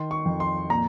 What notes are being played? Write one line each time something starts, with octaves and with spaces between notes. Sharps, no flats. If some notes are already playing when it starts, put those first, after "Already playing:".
Already playing: D#3 C6
C#6
F2
C6
A#2 A#5